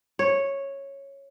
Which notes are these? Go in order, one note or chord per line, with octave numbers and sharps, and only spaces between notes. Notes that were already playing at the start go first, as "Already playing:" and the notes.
C#5